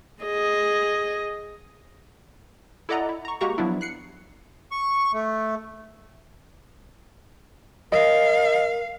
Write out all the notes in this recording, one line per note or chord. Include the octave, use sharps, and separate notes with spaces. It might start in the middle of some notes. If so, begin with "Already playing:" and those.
G#4 D#5
E4 A4 D5 D#5 F#5 A#5
E4
A#5 C#6
G#3 A#3 F#4 G4 A#5 C#6
F3 F#3 B3 D4 E4
F#6 C7 C#7
C#6
A3
A#4 D#5 F5